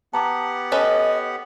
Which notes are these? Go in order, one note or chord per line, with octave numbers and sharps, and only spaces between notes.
B3 G4 F#5 A5 A#5 D6
C#4 A4 B4 D#5